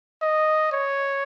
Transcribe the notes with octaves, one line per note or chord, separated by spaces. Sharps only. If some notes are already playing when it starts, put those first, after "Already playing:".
D#5
C#5